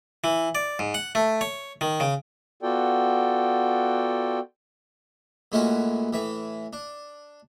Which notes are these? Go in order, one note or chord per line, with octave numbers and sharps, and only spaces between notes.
E3
D5
G#2
F#5
A3
C#5
D#3
C#3
B3 F4 F#4 A4 D5 G5
A#2 G#3 A3 C#4 E4 F#4
A2 E3 E5
D4